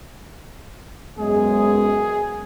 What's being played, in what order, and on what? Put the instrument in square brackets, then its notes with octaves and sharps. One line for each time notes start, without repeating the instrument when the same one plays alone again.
[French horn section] F#2 G#3 B3 [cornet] G#4